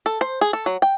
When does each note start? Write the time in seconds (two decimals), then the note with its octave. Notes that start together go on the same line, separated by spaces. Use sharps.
0.06 A4
0.21 C5
0.41 G#4
0.53 A4
0.66 F#3
0.82 G5